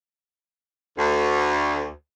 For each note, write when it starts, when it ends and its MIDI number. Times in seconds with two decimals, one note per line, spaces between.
0.98 1.89 38